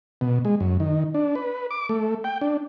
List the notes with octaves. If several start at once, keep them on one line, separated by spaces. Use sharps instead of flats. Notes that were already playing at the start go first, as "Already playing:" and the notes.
B2
G#3
F#2
D#3
D4
B4
D6
A3
G5
D4